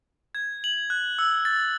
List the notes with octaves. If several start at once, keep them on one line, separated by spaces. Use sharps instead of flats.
G#6
F#7
F#6
E6
A6